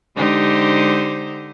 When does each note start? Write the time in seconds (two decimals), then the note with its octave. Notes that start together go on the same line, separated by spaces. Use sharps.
0.16 D3 G#3 D#4 G4 C5